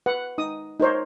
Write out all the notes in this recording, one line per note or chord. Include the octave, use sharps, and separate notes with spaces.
B4 F#5
D#4 D#6
D#4 A#4 C5 C#5